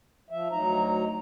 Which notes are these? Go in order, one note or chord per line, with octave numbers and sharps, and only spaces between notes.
F3 E5
D2 F#3 D#4 A#5